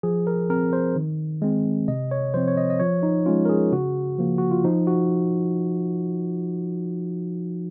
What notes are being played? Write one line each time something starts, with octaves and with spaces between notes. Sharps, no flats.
F3 G#4
A#4
C4 A#4
C5
D#3
G#3 C4
C3 D#5
C#5
F3 C4 C5
C#5
D#5
D#5
F3 C#5
D#4
G#3 C#4 F4
A#4
G#4
C#3 F#4
F3 A#3
F#4
F4
F3 D#4
F#4